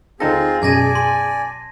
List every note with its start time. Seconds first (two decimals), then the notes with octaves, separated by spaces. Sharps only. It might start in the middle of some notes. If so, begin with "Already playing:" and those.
0.20 D2 C4 D#4 F4 G#4 A4 A#6
0.62 F#2 B2 D5 G#5 A5 G#6 A#6 D#7
0.95 C6